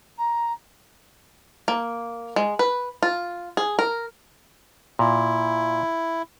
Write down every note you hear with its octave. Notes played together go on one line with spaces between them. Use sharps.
A#5
A#3
G#3
B4
F4
G#4
A#4
A#2 E4